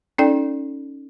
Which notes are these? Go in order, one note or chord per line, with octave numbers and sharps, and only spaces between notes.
C#4 D#4 A4 D5 G5